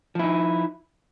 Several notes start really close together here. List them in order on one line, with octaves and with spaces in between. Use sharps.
F3 E4 D#4